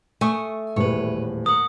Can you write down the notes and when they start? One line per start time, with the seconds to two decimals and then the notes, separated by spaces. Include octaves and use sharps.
0.21 A3 G#5 C#6 D#6
0.76 D#1 E2 A2 B4 C#5
1.46 A#4 F#5 D#6